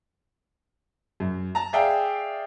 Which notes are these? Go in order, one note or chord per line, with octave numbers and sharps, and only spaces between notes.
F#2
A5 A#5
G#4 D5 E5 F5 G5